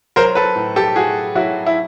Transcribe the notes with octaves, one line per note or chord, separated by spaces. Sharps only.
F#3 A#4 C5
A4 B4
A2
G4 A4
A2 F#4 G#4
F#3 E4 F#4
E4